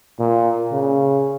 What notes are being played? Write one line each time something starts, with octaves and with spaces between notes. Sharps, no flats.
A#2
C#3